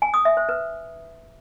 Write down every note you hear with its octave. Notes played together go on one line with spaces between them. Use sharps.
G#5
D#6
E5
C5
B4